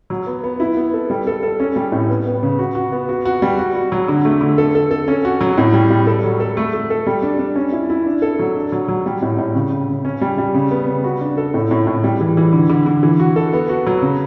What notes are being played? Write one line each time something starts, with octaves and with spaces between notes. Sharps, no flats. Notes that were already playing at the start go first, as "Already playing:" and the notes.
F#3
B3
B3
E4
B3
A4
G3
A4
A4
C#4
G3
A2
B3
B3
C#3
F#4
F#4
B3
F#4
F#4
G3
F#4
F#4
F#3
D3
A3
D3
A4
A4
A4
C#4
F#4
F#3
A2
G3
G3
A4
F#3
A4
A3
A3
A4
G3
D4
D4
C#4
E4
E4
D4
A4
F#3
D4
F#3
F#3
G3
A2
A2
C#3
C#3
C#3
C#4
G3
G3
C#3
B3
C#3
F#4
D4
A4
A2
A2
A2
G3
E3
E3
D3
D3
D3
E3
F#4
A4
B3
F#4
F#3
C#3